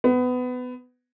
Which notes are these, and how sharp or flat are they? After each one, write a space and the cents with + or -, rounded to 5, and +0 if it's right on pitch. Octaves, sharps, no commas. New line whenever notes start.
B3 +20